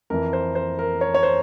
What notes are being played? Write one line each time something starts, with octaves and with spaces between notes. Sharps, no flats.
F2 E3 A#4
C5
C5
A#4
C#5
C#5
C5